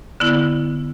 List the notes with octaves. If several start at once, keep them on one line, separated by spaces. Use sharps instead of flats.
D3 B3 E4